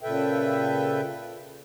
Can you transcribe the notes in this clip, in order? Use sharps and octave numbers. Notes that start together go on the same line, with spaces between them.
A#2 C#3 A4 B4 E5 G5